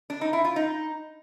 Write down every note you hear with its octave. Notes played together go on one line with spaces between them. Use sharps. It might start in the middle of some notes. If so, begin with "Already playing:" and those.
D4
D#4
E4
F4
D#4